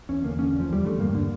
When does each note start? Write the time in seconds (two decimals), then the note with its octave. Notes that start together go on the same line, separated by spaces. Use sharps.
0.09 E2 C#4
0.24 D3 A#3
0.39 D3 C#4
0.55 E2 F3
0.70 E2 G3
0.84 D3 A3
0.99 G2 A#3
1.15 D3